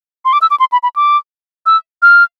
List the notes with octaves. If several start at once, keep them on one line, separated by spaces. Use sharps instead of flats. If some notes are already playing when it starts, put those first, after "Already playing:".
C6
D6
E6
D6
C6
B5
B5
D6
E6
F6